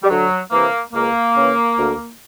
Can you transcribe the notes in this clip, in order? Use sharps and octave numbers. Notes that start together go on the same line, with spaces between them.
G3
D2 F#3
C3 E3 A#3
C#2 A#3
C#3 E3
D2